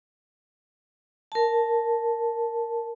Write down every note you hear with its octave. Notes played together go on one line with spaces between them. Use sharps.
A#4 A5